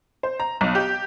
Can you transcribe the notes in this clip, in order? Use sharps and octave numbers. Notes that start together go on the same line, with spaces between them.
C5
A#5
B1
G4